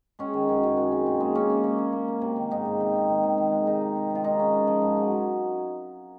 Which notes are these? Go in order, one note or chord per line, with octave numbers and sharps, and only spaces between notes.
G#3 C#4
D#3
F#2
F#2
G#3
C4
A#2
G#3
A#3 C#4
C#4
A#3
C#4
A#3
A#3
C3
D#3
G#2 D#4
G#2
C4
C4
D#3
D#3
D#3
G#3
D#3 D#4
C3
C4
D#3
F4
G#3 D#4
C#4
G#3
F3
G#2
F#3
F#3